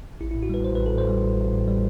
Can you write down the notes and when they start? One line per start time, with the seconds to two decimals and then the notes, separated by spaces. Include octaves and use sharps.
0.21 A1 E4
0.31 A2 E4
0.43 F#4
0.49 G3 B4
0.64 A1 C5
0.75 A1 B4
0.86 A4
0.94 A2 C5
1.09 G3
1.24 A1
1.37 A1
1.53 A2
1.68 G3